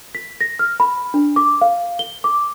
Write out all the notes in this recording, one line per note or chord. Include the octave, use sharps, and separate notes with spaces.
B6
A#6
F6
B5
D4
D6
F5
G7
D6